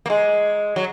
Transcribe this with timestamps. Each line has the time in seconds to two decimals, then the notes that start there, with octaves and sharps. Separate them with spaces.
0.06 A#3
0.10 G#3
0.76 F#3